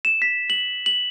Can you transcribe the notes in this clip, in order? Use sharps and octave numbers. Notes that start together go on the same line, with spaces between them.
E7
B6
F#7
F#7